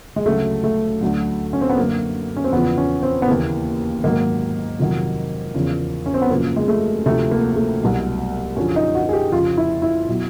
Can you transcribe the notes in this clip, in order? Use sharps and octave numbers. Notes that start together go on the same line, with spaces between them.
G#3
D2 C#3 F#3 A3
A3
D2 D3 F#3
C#4
C4
B3
F#2 D3 F#3 A#3
C#4
C4
E2 C#3 F3 B3
C#4
C4
B3
D#2 C#3 E3 A#3
G#2 D#3 F#3 A#3
F2 C3 D#3 F#3
E2 C#3 F3
C#4
C4
B3
F#2 C#3 F3 A#3
G#3
A3
D2 C3 F3 A3
A#3
A3
C2 B2 F#3
F#2 D3 F3 C#4
D#4
F#4
G#4
G4
F2 C#3 F3 F4
E4
E4
B2 F#3